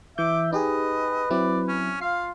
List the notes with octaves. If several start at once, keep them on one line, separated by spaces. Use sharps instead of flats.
E3 E5 D6 G6
D#4 G4 G#4 B4 D#5
F#3 C4 E4 D5
C#4
F4 F5 C7